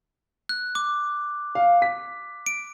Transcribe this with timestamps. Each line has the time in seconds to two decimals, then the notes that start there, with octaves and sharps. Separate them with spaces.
0.49 F#6
0.75 D6
1.55 F5
1.82 B6
2.46 D7